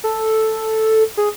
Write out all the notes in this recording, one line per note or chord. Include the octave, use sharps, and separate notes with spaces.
A4
G#4